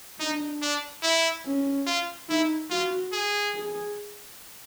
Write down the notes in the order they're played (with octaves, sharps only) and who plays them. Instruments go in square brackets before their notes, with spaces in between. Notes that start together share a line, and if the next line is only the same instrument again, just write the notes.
[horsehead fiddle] D4 [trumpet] D#4
[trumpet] D4
E4
[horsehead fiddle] C#4
[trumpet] F4
[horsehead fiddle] D#4 [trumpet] E4
[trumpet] F4 [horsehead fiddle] F#4
[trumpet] G#4
[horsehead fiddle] G#4